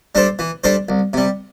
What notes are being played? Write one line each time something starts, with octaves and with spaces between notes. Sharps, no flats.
G3 D4 A4 C5
E3
G3 D4 A4 C5
C2
C3 G3